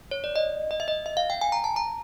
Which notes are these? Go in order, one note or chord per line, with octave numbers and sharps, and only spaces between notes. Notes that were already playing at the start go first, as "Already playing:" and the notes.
C#5
D5
D#5
D#5
E5
D#5
E5
F5
G5
G#5
A#5
A5
A#5